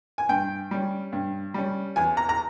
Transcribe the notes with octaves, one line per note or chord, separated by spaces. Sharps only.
G#5
G2 G5
G3 C#4
G2
G3 C#4
E2 G#5
A#5
A#5